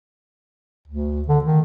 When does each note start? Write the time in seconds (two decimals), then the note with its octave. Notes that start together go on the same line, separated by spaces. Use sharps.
0.88 D2
1.28 D3
1.44 D#3